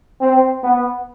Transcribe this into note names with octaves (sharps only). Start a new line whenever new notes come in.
C4
B3